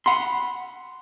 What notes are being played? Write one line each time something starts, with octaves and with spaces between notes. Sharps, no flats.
F#5 B5 C6